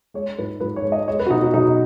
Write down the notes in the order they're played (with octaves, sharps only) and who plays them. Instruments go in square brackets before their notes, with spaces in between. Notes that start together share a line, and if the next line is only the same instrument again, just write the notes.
[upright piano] G#3 C#5
G#2 B4
G#2 B4
C#5
G#3
D#5
G#3 C#5
B4
F#4
B2 D#4
F#4
B2 D#4